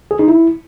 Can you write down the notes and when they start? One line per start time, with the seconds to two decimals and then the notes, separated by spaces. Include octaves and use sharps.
0.11 G#4
0.19 D#4
0.28 E4